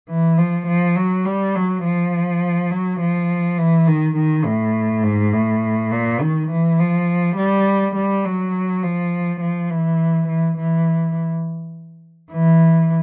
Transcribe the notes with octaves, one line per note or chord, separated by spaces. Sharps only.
E3
F3
F3
F#3
G3
F#3
F3
F#3
F3
E3
D#3
D#3
A2
G#2
A2
A#2
D#3
E3
F3
G3
G3
F#3
F3
F3
E3
E3
E3
E3